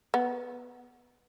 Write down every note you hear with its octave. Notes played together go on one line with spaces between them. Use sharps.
B3